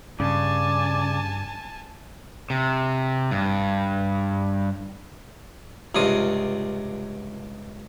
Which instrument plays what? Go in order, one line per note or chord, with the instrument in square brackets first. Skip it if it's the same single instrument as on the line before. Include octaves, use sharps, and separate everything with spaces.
[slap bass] G2 [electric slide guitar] C#3 [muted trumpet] D5 [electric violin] G#5 A5
[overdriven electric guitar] C3
G2
[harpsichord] C#2 G2 C3 F4 D#6